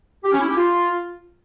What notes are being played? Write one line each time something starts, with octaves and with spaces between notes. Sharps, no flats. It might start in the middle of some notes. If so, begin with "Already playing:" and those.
G4
C#4
E4
G4
F4